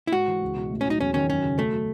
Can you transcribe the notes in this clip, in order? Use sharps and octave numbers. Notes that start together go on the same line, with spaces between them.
E4
G#2 F#4
E3
C#2
B2
A2
C#4
F#3 D#4
E2 C#4
D#3 C#4
F#2 C#4
C#3
B2 A3
F#3